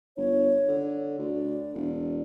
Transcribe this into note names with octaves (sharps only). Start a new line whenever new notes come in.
G1 C#5
D3
D2 D5
E1